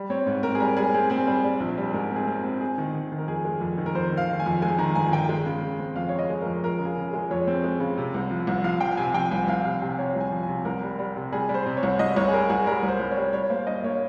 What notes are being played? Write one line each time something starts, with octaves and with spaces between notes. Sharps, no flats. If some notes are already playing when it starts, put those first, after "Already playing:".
Already playing: G3
C4 C#5
G#2
C4 A#4
G#4
G3 A#4
G3 G#4
C4 G#4
C4 G#4
G3 G#4
G3
A#1
G3
G#4
G#2 A#4
C4 G#4
C4
C4
G#3 G#4
D#3
D#3
D#3
A#4
F2 G#4
G#3
F2
D#3
A#4
F2 C5
D#3
F5
D#3
G#5
F2
G#3 G#5
D#3 A#5
G1 G#5
D#3 G5
G#3
C#3
C#3
C4
F2 F5
C#3 C#5
D#5
G#3
A#4
F2
F2 A#4
C#3
G#4
C#3
G#4
G#3
F2 C#5
C4
G#3
C#3
C3
C2
F3
C2
F3 F5
F3 G5
C3 G#5
F3 G5
C2 G#5
C2 F5
C3 F5
C3 G5
C3 C#5
C2 G#5
F3
G#5
C3
C2 A#4
G3
G3
C3
G3 G#4
G3
C5
C3
C#5
C2
C2 D#5
C2 C#5
G#4
G3 A#4
C2 G#4
G3 A#4
C2
C5
C2
C#5
G3
G3 C#5
A#3 C5
G2 D#5
A#3 C#5